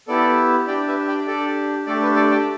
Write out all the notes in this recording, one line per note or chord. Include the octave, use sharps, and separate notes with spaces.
B3 E4 G4 A4 D5
D4 G4 D5 G5
B4 E5
D5 G5
D4 G4 A4 D5
A3 D4 G4 A4 D5
B4
A4 D5
D5 G5